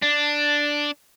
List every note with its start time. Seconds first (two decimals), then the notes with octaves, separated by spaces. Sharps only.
0.02 D4